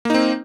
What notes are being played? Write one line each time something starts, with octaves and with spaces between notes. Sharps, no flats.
A#3 C4 D#4